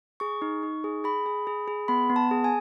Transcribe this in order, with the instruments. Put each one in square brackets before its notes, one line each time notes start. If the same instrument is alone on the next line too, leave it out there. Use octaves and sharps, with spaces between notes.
[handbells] G#4 C#6
D#4
D#4
G#4
G#4 B5
G#4
G#4
G#4
B3 B5
B3
A5
G#4
G#5